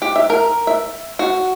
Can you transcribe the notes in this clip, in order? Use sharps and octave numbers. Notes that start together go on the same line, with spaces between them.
G4
E5
A#4
E5
F#4